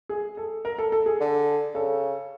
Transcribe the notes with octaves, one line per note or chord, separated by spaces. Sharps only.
G#4
A4
A#4
A4
A4
G#4
D3
C#3 A4